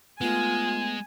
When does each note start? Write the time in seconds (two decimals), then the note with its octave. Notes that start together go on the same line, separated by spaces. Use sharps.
0.21 G#3 A3 B3 F4 G#5